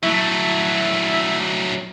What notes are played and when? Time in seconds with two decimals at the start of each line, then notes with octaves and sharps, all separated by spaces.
0.03 F#3 A3 E4